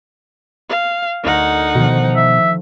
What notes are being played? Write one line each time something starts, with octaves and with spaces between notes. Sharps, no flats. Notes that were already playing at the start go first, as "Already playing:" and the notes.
F5
D2 D#4 A#4 F#5
B2 D#3 F3
E5